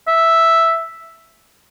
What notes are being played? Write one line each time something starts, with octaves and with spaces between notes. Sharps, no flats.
E5